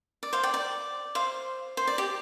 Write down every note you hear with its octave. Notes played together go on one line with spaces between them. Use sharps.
D5
C5 F5
D5 G5
D5
C5 F5
C5
D5
G4